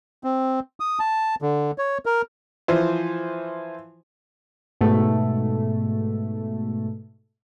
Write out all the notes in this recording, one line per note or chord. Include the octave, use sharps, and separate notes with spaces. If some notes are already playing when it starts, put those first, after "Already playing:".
C4
D#6
A5
D3
C#5
A#4
E3 F3 C5
G#2 B2 A3